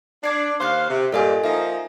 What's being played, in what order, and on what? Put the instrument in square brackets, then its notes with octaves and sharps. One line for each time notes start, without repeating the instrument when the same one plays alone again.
[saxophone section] D4 [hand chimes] D6 G#6 C7
[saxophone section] D#2 C5 F5 [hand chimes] C#6 F#6 C7
[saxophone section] C3
[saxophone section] G2 A#2 [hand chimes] A4 D#5 G#5
[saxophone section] F3 A#3 D#4 [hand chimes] E5 G#5